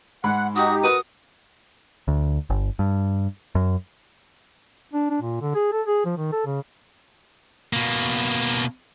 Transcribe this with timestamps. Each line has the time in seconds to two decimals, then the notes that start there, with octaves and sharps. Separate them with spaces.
0.24 G#2 F#5 B5
0.56 D#4 F#4 G4 D#6
0.83 F#4 A#4 B4 D#6
2.08 D2
2.50 G1
2.79 G2
3.55 F#2
4.93 D4
5.10 D4
5.21 A#2
5.42 D3
5.55 G#4
5.72 A4
5.87 G#4
6.05 F3
6.17 D#3
6.32 A4
6.46 C#3
7.73 B2 A#3